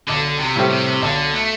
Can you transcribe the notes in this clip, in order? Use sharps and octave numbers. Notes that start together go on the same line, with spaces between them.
B1 D3
C3
A2 G3 C4 G4
C3
B1 D3
A3